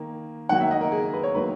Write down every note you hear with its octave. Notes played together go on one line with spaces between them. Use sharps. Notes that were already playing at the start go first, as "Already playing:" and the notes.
Already playing: D#3 A#3
D#3 F#3 A#3 F#5
E5
D#5
A#4
G#4
B4
C#5
D#3 F#3 A#3 B4